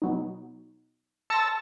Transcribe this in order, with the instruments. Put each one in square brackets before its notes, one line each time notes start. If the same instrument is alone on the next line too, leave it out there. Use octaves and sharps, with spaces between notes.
[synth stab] B2 F#3 D#4
[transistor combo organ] A5 E6 [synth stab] C6 A#6 C#7